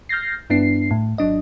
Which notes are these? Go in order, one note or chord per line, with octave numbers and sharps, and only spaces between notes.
F6 G6 A6 A#6 C7
G2 B3 D4 E4 C7
A2
G#1 F#3 D4 D#5